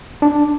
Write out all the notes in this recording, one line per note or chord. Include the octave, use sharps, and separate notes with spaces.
D4